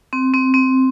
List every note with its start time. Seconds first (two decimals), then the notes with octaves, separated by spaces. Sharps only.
0.13 C4
0.34 C4
0.54 C4